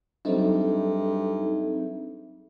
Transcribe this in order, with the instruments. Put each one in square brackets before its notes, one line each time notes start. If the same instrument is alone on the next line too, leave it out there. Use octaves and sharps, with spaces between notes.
[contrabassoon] G2 [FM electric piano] F#3 C4 D#4 [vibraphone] G#4 A4 E5